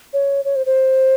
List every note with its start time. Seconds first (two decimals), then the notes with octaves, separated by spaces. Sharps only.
0.13 C#5
0.45 C#5
0.56 C5
0.66 C5